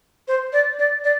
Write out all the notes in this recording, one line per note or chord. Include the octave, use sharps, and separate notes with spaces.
C5
D5
D5
D5